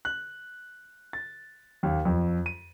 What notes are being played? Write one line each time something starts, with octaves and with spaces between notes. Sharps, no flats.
F#6
A6
D#2
F2
D#7